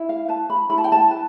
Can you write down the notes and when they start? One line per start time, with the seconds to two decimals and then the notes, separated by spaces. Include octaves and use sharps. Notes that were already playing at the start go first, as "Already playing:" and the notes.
Already playing: E4
0.09 F5
0.28 B4 A5
0.50 B5
0.70 E4 B5
0.78 A5
0.84 G5
0.92 A5
1.11 B4